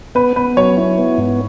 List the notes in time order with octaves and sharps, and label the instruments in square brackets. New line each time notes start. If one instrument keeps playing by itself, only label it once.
[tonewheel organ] B3 [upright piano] B4
[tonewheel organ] B3 [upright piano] B4
[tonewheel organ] F#3 [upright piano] C#5
[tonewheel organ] E4
B3
G#2